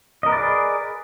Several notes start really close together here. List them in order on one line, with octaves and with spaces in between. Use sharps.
D#5 A#4 B4 D5 G#4